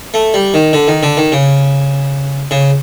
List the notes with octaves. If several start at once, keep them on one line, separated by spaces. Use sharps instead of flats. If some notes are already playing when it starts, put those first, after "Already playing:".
A3
G3
D#3
D3
D#3
D3
D#3
C#3
C#3